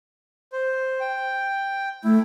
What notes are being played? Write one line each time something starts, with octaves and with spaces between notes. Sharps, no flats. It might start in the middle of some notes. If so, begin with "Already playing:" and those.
C5
G5
A3 E4